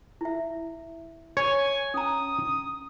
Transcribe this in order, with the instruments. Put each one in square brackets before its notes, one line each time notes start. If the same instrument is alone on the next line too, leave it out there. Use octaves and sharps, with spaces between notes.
[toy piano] E4 E5
[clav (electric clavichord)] C#5 [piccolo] G#5
[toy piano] C#4 A#5 [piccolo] D#6